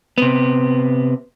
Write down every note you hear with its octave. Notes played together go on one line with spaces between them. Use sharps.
C3 B3